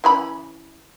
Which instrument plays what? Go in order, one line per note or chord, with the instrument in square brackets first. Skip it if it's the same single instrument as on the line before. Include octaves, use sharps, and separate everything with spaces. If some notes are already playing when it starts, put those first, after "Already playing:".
[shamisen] E3 C#4 B5